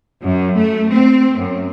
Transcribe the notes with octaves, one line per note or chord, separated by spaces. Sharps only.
F#2
A3
C4
F#2